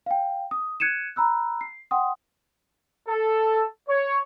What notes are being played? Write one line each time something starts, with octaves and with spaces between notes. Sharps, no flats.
F5 G5
D#6
F#6 G#6 C#7 D#7 E7
A#5 B5 E6 F#6
C7
F#5 G5 C6 D#6
A4
C#5